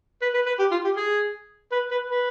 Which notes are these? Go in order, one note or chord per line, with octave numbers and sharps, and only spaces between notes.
B4
B4
B4
G4
F4
G4
G#4
B4
B4
B4